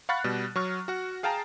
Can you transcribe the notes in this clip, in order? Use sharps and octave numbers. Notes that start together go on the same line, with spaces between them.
F5 F#5 B5 C#6 F#6 A6
B2 G3
F#3 C#6 F6
F#4 F#5
G#4 F5 G5 A5 A#5